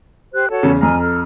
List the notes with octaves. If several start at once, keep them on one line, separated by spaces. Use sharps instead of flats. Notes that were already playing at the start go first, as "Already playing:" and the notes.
G4 C5 F#6
F#4 A4 C#5
E2 C#3
F2 G#5 A#5 F6
A4 F6